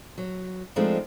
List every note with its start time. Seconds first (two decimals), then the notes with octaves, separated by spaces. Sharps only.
0.18 F#3
0.76 F3 G#3 A3 C4 D4 D#4